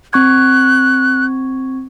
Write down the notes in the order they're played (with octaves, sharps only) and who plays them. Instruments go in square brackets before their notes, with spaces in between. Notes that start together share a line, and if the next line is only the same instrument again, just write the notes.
[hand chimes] C4 C#6 G#6 [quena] F#6